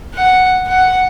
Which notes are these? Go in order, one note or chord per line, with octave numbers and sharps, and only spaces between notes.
F#5
F#5